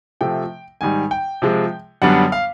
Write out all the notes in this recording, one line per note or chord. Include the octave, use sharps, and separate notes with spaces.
C3 F3 A3 G5
G#2 D#3 G3 G#5
G5
C3 F3 G#3
F#2 D3 G3 B3 D4 F#5
F5